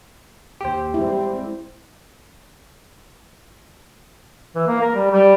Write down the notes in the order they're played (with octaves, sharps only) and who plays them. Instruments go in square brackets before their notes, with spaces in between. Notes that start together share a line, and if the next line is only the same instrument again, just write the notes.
[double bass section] D#2 [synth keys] G4 C5
[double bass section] G3 G#3 C4 [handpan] E4
[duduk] E3
A#3
A#4
G3
G3